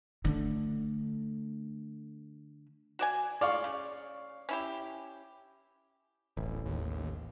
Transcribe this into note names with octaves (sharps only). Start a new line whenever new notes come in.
D3 A3
F#4 D5 G#5
F4 D5 F5 C#6
C#3
C#4 E4 G4
D1 A1
D#2